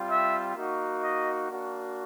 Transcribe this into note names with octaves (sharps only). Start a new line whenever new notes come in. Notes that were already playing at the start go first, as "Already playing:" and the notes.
Already playing: G3 C4 F4
E5
A#3 D#4 F#4
D#5
A#3 D4 F#4